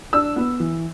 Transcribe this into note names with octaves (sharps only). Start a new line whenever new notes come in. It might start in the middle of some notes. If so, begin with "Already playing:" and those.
D4 E6
B3
E3